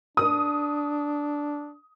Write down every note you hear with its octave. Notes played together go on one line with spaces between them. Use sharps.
D4 D#6